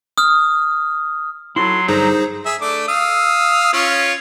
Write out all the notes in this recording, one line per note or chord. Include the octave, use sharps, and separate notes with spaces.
D#6 F6
F#3 E4 F#4 A4 C6
G2 D3 D#4 G#4 A#4 C5 A#5
G#4 E5
A3 D4 D6
F5 D#6 E6
C#4 F4 C#5